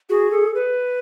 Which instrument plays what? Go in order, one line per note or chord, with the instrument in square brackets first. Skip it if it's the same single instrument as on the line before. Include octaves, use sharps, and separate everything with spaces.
[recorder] F#4 [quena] G#4
[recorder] A4
B4